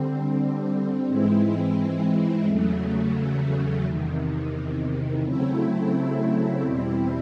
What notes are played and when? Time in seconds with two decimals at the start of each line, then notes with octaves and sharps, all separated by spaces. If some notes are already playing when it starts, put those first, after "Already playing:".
Already playing: D3 G3 C4
1.07 G#2 E3 G#3 C4 E4
2.46 E2 C#3 F#3 A3
3.84 E2 C3 D#3
5.23 C#3 F#3 A3 C4 E4
6.61 E2 B2 G3 C4 E4